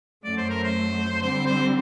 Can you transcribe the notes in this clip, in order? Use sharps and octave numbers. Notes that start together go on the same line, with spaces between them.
F#2 F#3 A3 D5
C5
A#4
C5
D3 G3 C4 C5
C5